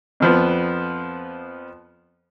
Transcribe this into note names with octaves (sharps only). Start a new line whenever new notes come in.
F2 F3 B3